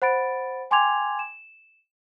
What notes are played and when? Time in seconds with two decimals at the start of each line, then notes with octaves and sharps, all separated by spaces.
0.02 C5 F#5 B5 A6 D7
0.71 G5 G#5 C6 D6 G#6 F7
1.19 E7